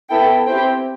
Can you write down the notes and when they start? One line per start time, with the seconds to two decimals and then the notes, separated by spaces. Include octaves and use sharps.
0.10 B3 E4 A4 G5
0.46 C4 E4 G4 G5